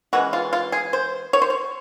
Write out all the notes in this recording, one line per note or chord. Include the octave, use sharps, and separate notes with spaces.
E3 G#3 C#4 F#4
F4
F4
G#4
C5
C#5
C5
C#5